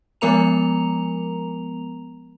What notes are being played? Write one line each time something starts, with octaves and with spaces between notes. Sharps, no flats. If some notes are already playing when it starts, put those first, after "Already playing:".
F3 G#3 B3 A#4 A#5 F7